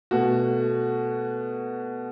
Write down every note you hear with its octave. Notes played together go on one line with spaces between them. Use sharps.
B2 A3 F#4